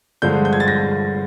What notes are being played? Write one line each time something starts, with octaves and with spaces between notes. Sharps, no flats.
G2 D3 F3 G#3 G6
G6
G#6
A6
A#6